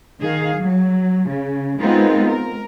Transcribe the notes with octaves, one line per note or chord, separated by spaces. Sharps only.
D#3 G#4 F5
F#3
C#3
G#3 B3 C4 D#4 F4 A#4
A#4